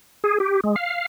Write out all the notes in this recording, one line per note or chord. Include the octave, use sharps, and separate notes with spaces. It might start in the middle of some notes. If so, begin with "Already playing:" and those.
G#4
G4
G#3
F5